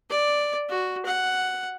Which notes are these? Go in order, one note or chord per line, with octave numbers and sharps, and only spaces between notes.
D5
F#4
F#5